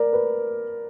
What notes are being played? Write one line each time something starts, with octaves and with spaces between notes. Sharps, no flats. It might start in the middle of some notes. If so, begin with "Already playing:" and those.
Already playing: A#4 D5
B4